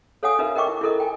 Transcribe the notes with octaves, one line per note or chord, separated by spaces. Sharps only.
A4 C#5 F5 F#5 G#5 D#6
D#4 F4 A#4 B4 E5 F5
A#4 D#5 G5 C#6 D6
E4
E4 F4 A4 A#4 D#5
G5 G#5